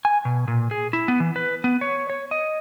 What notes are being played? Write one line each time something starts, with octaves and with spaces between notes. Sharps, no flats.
G#5
B2
A#2
G#4
E4
B3
E3
B4
B3
C#5
C#5
D#5